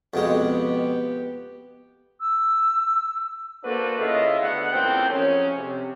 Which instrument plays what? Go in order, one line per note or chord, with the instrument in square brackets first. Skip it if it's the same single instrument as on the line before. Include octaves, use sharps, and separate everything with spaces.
[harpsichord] F2 B2 G#3 [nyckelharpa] B3 G4
[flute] E6
[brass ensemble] A#3 D4 F#4 A4 B4 C5
C#3 E4 F4 D#5 E5
D2 A3 B3 D4 F#5
A1 E2 G2 A#2 C4 G5
F2 C#3 F#3 C#4
C3